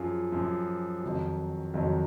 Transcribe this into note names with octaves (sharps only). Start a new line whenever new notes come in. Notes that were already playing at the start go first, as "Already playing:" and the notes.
Already playing: F#2 F3 F4 G#4
F#2 F3
F2 D#3 F#3
F2 D#3 F#3